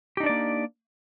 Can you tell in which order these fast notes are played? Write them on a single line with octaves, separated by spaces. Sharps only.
G4 D#4 D4 D5 A#3